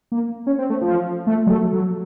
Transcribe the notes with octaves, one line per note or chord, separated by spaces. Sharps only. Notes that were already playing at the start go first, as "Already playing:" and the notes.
A#3
C#4
C4
A3
F3
A3
F#3
A3
F#3